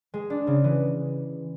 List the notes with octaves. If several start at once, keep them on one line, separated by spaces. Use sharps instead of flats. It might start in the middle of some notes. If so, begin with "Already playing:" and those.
G#3
D4
C#3
E3